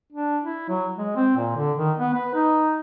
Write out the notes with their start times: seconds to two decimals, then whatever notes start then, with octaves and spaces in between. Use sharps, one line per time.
0.13 D4
0.44 E4
0.69 F#3
0.97 G#3
1.16 C4
1.37 A#2
1.56 D3
1.77 D#3
1.98 B3
2.14 B4
2.34 D#4